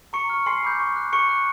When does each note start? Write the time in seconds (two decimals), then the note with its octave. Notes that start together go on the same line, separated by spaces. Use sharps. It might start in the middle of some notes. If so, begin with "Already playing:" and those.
0.13 A#5 C#6 C#7
0.30 C#6 F6
0.46 G#5 C6 C7
0.63 B5 D6 G6
0.80 C#6
0.96 F#6
1.13 C#6 C#7
1.29 F#6